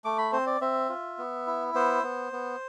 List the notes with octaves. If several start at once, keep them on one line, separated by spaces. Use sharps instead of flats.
A3 D6
B5
C4 C5
D5
C4 E5
F4
B3
E4
B3 C5
B3
B3